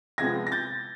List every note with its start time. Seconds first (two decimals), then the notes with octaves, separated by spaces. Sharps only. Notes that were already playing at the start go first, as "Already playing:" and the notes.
0.18 C3 F3 G#3 B3 G#6 A#6
0.47 A#6
0.52 G6 A6